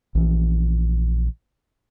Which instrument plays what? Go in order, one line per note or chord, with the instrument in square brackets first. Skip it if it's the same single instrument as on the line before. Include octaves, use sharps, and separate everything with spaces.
[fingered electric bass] A#1 E3